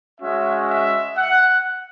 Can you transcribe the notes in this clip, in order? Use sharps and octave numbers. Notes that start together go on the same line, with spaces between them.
G#3 C#4 F#4 E5
E5
F#5